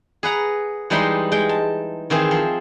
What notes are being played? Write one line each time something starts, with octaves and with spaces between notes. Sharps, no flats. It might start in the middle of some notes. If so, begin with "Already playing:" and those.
G#4 B4 F#5 A#5
E3 G3 G#3 D#4 B4 C5
G#3 G5
A5
D#3 E3 C4 G#4
F3